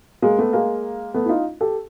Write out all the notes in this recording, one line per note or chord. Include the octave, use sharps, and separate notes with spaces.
G#3 A#3
A3 B3
G#3 A#3
A3 B3
E4
D#4 F4
G4 A4